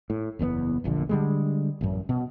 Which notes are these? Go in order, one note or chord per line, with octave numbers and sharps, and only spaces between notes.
A2
F#1 E2 C#3 B3
E1 A#1 A#2 D3
D3 G3 G#3
A1 F#2
B2